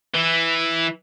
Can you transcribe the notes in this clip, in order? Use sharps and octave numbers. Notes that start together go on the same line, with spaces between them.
E3